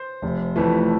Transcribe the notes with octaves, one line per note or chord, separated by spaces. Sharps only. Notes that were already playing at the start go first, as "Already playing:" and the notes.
Already playing: C5
F1
F2 E3 A3